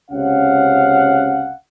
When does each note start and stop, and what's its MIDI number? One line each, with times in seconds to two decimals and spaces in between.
0.11 1.54 37
0.11 1.54 48
0.11 1.54 61
0.11 1.54 77
0.11 1.54 78